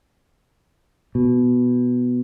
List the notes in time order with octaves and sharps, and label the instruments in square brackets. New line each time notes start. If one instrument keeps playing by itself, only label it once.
[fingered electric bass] B2